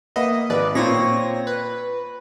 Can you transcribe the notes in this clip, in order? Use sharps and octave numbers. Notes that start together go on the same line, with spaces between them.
A#3 B4 D#5 E5 F#5
G#1 B4 D5
A#2 C4 C#5 A#6
B4